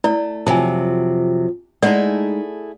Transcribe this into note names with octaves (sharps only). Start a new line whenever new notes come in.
A3 E4 D5
F2 C3 F3 F#3 G#5 A5
G#3 A3 D#4 E4 G#4 D5 F#5